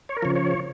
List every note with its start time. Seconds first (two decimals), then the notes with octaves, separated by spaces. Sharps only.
0.09 C#5
0.16 A#4
0.22 C#3 F3 C#5
0.36 C#5